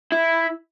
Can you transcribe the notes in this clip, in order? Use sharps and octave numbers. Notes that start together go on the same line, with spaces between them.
E4